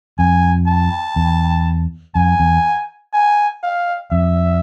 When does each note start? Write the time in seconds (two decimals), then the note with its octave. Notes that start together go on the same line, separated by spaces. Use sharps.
0.19 F2 G#5
0.67 A5
1.16 E2
2.15 F2 G#5
2.40 E2
3.13 G#5
3.63 F5
4.11 F2 E5